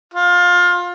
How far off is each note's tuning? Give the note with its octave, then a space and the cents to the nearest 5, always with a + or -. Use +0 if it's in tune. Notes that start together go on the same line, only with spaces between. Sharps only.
F4 +25